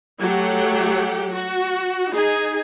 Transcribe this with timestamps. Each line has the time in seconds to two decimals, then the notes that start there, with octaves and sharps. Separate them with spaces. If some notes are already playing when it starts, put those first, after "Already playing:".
0.20 F#3 A3 G4 F#5
1.33 F#4
2.11 D#4 G#4